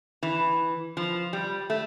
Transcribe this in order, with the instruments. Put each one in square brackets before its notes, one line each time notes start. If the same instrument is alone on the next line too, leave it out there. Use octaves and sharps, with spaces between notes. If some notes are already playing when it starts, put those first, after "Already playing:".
[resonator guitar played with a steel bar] E3
F3
G3
A3